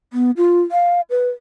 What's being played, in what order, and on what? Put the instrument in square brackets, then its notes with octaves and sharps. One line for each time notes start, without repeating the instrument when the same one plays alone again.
[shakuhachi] B3
F4
F5
B4